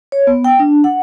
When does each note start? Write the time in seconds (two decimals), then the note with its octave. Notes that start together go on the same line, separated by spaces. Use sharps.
0.12 C#5
0.27 B3
0.44 G5
0.59 D4
0.84 F#5